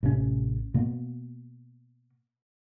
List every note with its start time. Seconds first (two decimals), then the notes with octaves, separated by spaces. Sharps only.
0.03 A1 C3 D#3 C#4
0.74 B2 A#3 B3